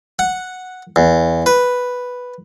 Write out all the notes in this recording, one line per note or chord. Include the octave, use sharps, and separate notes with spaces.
F#5
E2
B4